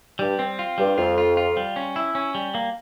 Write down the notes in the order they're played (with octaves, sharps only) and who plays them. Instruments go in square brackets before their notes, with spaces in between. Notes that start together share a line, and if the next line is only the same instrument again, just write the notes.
[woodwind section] G2 [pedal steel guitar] G3
[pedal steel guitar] C4
F4
[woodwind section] G2 [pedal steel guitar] G3
[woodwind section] F2 [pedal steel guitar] F4
[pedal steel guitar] F4
F4
G3
C#4
E4
C#4
G3
A#3